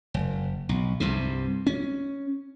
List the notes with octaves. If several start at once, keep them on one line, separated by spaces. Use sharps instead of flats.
F#1
B1
C2 G2 C3
C#4